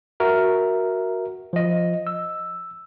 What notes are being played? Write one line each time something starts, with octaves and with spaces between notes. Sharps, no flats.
F#4 A#4 E5
F3 D#5
E6